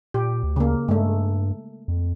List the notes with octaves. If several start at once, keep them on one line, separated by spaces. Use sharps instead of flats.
A#2 G4
D2
C#3 A#3
G2 G#3 A3
F2